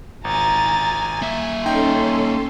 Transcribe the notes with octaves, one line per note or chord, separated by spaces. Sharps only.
G#1 G#5 A#5 A6
A#3 E5
C#4 D#4 A4 G5 C6